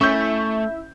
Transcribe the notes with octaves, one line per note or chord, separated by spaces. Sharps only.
A3 C#4 E4 E5 C#6 G6